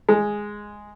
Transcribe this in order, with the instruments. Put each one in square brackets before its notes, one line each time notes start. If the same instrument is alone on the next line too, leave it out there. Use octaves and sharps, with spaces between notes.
[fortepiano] G#3